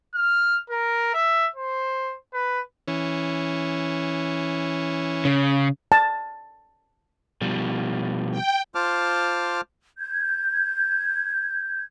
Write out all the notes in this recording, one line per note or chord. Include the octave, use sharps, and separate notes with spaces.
F6
A#4
E5
C5
B4
E3 C#4
C#3
A5
B2 F3 G3
G5
F4 C5 A5 D6 F6
G6 G#6